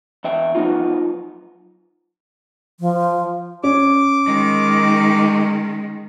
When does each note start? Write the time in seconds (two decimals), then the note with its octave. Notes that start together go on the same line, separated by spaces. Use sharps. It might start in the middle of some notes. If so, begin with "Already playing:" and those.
0.24 E2 E5 G5
0.55 F3 F#3 B3 C4 D#4 F4
2.80 F3
3.64 C#4 D6
4.26 D#3 G#3